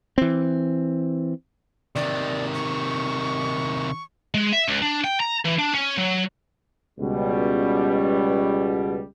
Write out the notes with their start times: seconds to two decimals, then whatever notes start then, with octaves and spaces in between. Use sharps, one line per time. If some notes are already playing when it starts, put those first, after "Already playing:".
0.18 E3 C4
1.96 C3 D#3 D5
2.54 C#6
4.34 G#3
4.53 E5
4.68 C#2
4.82 D4
5.04 G5
5.20 A#5
5.45 E3
5.59 D4
5.74 C#4
5.98 F#3
6.99 C#2 B2 G3